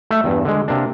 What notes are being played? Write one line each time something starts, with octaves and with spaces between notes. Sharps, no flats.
A3 E5
E2 G2
D3 G#3
C3 A#3 D4